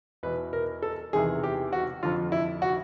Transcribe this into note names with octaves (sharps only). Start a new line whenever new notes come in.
E2 B2 B4
A#4
A4
E2 C3 D#3 G#4
G4
F#4
F2 D3 F4
E4
F#4